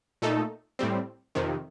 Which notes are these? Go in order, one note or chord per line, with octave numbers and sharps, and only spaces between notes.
A#2 A3 D#4 A4
A2 G3 C4
F2 C3 D#3